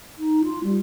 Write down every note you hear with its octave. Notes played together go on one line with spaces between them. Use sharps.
D#4
F4
G3